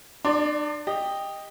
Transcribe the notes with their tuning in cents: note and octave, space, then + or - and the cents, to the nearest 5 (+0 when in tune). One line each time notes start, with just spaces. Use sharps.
D4 +40 D5 +0 C6 +0
G4 +15 D#5 +0